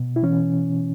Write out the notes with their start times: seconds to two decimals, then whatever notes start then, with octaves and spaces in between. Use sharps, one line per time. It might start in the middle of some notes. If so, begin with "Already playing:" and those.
Already playing: B2
0.16 E4
0.23 E3 C#4